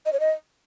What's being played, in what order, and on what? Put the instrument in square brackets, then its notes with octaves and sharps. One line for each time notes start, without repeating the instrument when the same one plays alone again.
[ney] D#5
C#5
D#5